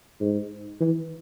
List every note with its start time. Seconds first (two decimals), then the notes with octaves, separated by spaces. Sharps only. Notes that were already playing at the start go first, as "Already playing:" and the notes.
0.21 G#2
0.80 E3